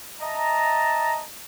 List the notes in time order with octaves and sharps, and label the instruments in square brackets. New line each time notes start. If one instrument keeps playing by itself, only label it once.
[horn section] D#5 E5 A5 A#5